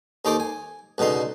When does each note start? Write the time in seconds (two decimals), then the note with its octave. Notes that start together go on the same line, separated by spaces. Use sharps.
0.25 D#2 D#4 A4 C5 D6
0.40 G#5
0.98 C#2 B2 D3 D#4 C6